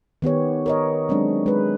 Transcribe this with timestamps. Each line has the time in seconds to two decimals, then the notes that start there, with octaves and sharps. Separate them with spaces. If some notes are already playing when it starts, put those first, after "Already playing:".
0.22 D#3 B3 G4 C#5
0.66 A#4 C#5 D#5
1.09 F#3 G#3 C4 D4
1.46 G#3 B4